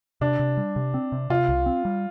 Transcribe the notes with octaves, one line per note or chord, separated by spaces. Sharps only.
C3 D4
C3
G3
C3
C4
C3
C3 F4
C2
C4
G3